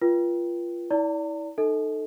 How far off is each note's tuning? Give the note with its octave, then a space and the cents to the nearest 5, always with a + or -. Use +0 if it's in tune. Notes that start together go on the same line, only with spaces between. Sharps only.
F4 -15 B4 -35 G5 +5
E4 -30 D5 -25 A#5 -40
D#4 -30 A4 +0 D#5 +40